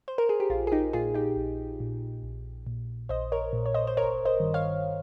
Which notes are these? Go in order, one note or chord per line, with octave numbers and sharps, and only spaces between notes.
C5
A#4
G#4
G4
A#1 F4
G#4
D#4 G4
A#2 F4 G#4
D#4 G4
A#1
A#2
A#1
A#2
A#1 C5 D#5
A#4 C#5
A#2
C#5
C5 D#5
C5
G1 A#4 C#5
C5 D#5
G2 D#3
C#5 F5